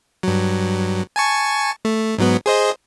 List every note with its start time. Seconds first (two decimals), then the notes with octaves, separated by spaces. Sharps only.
0.23 G2 F#3
1.16 G#5 A5 C#6
1.85 A3
2.18 G#2 F#3 B3
2.46 G#4 C5 D#5